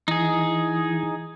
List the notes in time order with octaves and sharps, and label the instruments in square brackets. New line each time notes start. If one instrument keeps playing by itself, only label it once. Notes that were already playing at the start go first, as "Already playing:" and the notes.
[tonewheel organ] E3 [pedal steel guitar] D#4 G#4